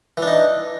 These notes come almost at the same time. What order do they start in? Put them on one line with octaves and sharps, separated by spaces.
E3 D4 D#4